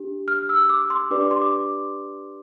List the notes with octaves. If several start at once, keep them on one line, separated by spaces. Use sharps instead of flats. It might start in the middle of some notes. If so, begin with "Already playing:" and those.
Already playing: D4 G4
F6
E6
D6
C6
D4 G4 B4 D5 D6
D6
C6
D6